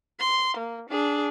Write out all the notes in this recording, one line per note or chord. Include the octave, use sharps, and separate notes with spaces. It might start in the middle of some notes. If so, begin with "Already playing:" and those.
C6
A#3
D4 G#4